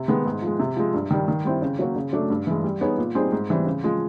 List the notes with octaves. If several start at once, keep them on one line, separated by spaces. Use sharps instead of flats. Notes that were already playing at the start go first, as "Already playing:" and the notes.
Already playing: C3
D#3 G#3 B3
G#2
F3 G#3
C3
F3 G#3
G2
D#3 G3
D#3
G3 C4 E4
C#3
F#3 A#3 C#4 F#4
C#3
F#3 A3 D4
G2
E3 G#3
G3
B3 D#4 G#4 C#5
A#2
G3 C4 D#4 G#4
G#2
E3 G3 C4
C#3
F3 G#3